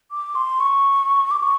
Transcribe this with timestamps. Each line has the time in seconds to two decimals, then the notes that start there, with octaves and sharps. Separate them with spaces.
0.11 D6
0.35 C6
0.60 C#6
1.31 D6
1.43 C#6